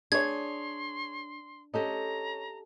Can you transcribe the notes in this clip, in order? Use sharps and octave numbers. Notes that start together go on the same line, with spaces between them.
D4 G#4 C#5 C6 G#6
C#4 G4 A4 D#5 A#5